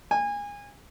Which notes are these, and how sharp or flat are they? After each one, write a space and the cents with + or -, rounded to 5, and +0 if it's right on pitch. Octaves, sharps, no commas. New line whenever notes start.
G#5 -25